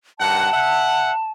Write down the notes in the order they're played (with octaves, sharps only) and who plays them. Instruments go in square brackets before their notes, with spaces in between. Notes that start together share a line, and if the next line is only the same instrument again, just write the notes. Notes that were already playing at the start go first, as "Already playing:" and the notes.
[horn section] G2 D#3 F#5 [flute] A5
[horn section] E5 F#5